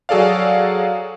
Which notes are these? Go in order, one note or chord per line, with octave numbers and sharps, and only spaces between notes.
F#3 F#4 G#4 A4 D5 F5